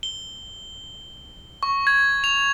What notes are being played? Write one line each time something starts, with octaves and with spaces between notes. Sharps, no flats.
G7
C#6
G#6
F7